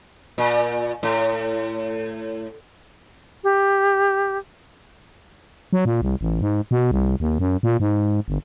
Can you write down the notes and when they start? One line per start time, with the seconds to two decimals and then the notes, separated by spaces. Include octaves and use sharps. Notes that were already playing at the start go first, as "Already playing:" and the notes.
0.38 A#2
1.03 A2
3.44 G4
5.73 F#3
5.85 A#2
6.02 C2
6.21 A1
6.41 G#2
6.71 B2
6.91 C2
7.20 D#2
7.39 F#2
7.63 A#2
7.80 G#2
8.28 G1